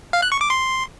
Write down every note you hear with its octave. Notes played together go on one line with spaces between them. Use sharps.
F5
F#6
C#6
D6
C6